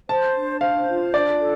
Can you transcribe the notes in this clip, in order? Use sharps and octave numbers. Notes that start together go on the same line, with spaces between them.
C5 A5
D4
C5 F5
F4
D4 D5
A4